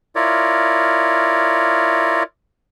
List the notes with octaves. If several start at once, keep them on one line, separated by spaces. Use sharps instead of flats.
E4 F4 A#4 C#5 D5